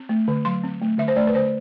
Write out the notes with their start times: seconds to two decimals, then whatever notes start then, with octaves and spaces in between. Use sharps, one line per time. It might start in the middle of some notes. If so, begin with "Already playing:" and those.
Already playing: C4
0.09 A3
0.28 D3
0.45 F#3 C6
0.63 C4
0.82 A3
0.98 D3 E5
1.08 C5
1.16 A3 D5
1.27 B4
1.35 D3 C5